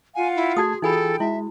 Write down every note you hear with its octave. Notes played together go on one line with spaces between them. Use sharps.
F4 F5 F#5 G#5
E4
A3 F#4 G#4 A5 D#6 G#6
E3 D#4 F4 G#4 A4 G5 G#5 B5
G#3 E4 E5